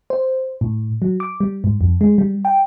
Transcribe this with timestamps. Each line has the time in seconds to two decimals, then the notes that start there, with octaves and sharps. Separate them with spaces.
0.10 C5
0.61 A2
1.02 F#3
1.20 D6
1.40 G3
1.64 G#2
1.81 F2
2.01 G#3
2.18 G3
2.45 G5